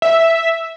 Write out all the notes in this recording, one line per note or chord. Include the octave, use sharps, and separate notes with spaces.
E5